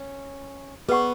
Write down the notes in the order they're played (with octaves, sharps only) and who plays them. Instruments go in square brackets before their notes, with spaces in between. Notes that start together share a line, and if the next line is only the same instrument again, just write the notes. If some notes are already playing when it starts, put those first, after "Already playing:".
Already playing: [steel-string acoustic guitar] C#4
[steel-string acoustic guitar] B3 [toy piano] G#4 B4 D5 F#5 C#6